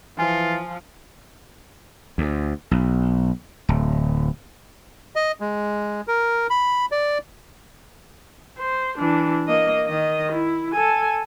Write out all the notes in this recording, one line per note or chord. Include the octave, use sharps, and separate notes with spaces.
E3 F3 F4 G#5
D2
B1
D1
D#5
G#3
A#4
B5
D5
C5
E3 D4
A#3 D#5
D#3 D#5
E4
A4 G#5